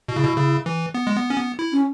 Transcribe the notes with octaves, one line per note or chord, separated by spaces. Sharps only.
B2 E4
C#3
B2
C#3
E3
B3
G#3
B3
C#4
B3
E4
C#4